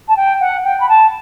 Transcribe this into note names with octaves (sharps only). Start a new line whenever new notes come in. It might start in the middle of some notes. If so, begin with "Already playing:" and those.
A5
G5
F#5
G5
B5
A5